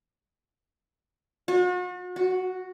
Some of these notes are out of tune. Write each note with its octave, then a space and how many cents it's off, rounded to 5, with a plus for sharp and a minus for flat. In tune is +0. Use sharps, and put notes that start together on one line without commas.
F#4 -40
F#4 +0